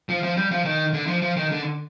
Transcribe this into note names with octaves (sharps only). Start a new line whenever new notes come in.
F3
F3
G3
F3
D#3
D3
F3
F3
D#3
D3